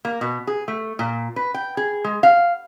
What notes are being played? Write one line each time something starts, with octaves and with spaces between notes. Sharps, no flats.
A#3
B2
G#4
A3
A#2
B4
G5
G#4
G#3
F5